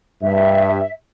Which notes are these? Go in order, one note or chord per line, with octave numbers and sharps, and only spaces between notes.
G2 E5